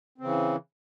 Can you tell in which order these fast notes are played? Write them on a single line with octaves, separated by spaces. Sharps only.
C4 C#3 E3